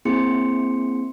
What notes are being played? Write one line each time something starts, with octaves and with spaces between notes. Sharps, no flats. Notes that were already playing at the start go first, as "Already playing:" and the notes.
A#3 C4 E4 G#4 C6 C#7